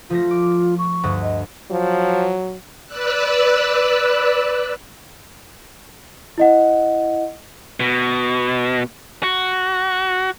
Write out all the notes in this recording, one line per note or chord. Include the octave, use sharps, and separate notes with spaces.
F3 A3 F4 A#6
D6
C#6
D2 G2 D3
D#5
F3 F#3
B4 D5 E6 F#6
E4 D#5 F#5
B2
F#4